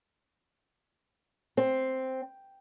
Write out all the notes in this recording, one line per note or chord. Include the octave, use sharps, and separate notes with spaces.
C4